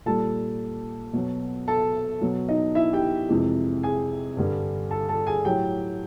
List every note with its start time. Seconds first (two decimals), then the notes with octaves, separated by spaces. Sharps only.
0.06 A#2 G3 A4 A5
1.13 B2 F#3
1.68 A4 A5
2.21 B2 F#3
2.49 D#4 D#5
2.75 E4 E5
2.93 G4 G5
3.29 F2 C3 E3 G#3
3.83 G#4 G#5
4.37 G2 D3 G3
4.91 A4 A5
5.09 A4 A5
5.27 G#4 G#5
5.45 A2 F#3 G4 G5